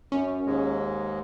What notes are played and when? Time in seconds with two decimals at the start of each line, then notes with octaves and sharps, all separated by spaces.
0.12 F#2 C#4
0.46 D#2 G#2 G#3